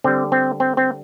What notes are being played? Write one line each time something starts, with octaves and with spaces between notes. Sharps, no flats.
D3 G3 C4
C4
C4
C4